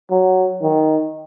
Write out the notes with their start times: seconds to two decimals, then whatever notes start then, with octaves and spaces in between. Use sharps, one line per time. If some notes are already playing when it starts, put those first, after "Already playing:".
0.11 F#3
0.62 D#3